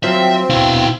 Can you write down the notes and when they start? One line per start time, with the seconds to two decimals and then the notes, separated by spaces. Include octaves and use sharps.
0.04 F#3 C4 F4 C5 E5
0.50 B2 E4 F5